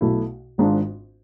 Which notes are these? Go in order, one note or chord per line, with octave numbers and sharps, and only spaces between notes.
B1 B2 A3 E4
G#1 G#2 G#3 D4 F4